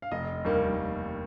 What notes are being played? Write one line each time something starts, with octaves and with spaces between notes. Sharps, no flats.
F5
F1 D#5
D#2 D#3 G3 A#3